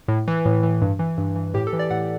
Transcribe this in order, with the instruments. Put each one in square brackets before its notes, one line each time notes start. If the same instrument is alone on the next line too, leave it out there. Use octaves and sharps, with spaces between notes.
[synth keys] A2
E3
A2
E3
G2
E3
G2
E3
A2 G4
A4
E3
D5
A2 F#5